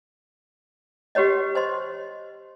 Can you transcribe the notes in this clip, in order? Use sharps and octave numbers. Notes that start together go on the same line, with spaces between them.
F#4 G4 B4 C#5 D#5
C5 D#5 C6